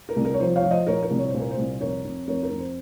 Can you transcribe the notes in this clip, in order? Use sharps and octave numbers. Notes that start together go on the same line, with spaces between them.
A#4
C2
A#4
C#5
F3 C5
C#5 F5
F3
C5 D#5
A#2 A#4 C#5
A#4
C2
C#5
C5
A#2
A#4
C5
C2
F2 A#4 C#5
F2
F2 A#4 C#5
A#4
F2
C5